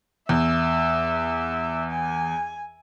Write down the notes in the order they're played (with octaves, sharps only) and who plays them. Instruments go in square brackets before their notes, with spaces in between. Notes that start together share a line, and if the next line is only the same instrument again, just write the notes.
[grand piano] E2 [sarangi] E5
[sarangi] G#5